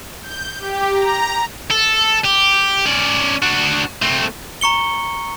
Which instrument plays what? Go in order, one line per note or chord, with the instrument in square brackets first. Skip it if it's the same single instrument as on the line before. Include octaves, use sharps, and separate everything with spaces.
[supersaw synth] G6
G4
A#5
[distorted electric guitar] A4
G4
C#4 D5
D4 F#4
A3 C4
[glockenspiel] A#5 C#6 C#7 G7